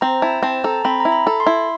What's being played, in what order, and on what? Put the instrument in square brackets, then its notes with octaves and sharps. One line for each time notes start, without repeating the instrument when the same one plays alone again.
[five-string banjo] C4 [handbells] A#5
[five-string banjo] E4 [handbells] A5
[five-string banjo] C4 [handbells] A5
[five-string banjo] A4 [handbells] A#5
[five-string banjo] C4 [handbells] B5
[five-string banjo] E4 [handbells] A#5
[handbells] B5
[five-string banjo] A4
[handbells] C6
[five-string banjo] E4